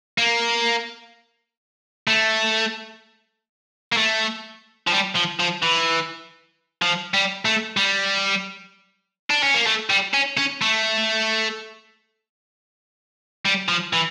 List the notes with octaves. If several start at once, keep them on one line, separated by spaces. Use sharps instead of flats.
A#3
A3
A#3
A3
F3
G3
F3
F3
E3
F3
G3
A3
G3
D4
C#4
A#3
A3
G3
C#4
C#4
A3
G3
F3
E3